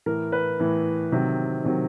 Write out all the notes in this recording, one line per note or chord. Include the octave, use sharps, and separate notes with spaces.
A2 E3 A#4
B4
A2 E3
C3 D#3 F#3
C3 D#3 F#3